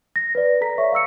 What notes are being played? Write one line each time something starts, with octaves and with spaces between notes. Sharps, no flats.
A#6
B4 D5
A4 A#5 B6
C#5 D5 E5 C#6
F5 C#6 E6 C#7